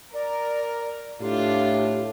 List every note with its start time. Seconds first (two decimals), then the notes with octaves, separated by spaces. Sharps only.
0.14 A#4 D5
1.21 A2 D4 F4 G4